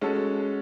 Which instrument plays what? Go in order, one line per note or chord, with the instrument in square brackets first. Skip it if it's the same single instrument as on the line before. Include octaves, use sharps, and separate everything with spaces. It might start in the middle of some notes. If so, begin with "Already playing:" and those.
[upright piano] G#3 C#4 F#4 A4